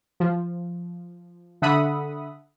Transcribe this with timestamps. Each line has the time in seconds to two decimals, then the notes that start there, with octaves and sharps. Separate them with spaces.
0.20 F3
1.62 D3 A4 E5 F#5 B5 D#6